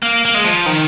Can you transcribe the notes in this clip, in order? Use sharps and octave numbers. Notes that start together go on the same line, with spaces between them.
A#3
A#3
G#3
F3
D#3